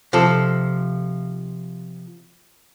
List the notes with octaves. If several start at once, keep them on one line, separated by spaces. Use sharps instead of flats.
C3 F3 A4